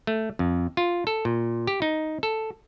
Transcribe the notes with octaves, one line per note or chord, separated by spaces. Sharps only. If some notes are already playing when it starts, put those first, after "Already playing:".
A3
F2
F4
A4
A#2
G4
D#4
A4